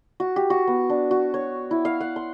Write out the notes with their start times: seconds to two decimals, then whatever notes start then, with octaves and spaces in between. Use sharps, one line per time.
0.20 F#4
0.36 G4
0.50 F#4
0.67 B3
0.90 D4
1.11 F#4
1.34 C#5
1.71 E4
1.85 F5
2.01 F#5
2.16 C6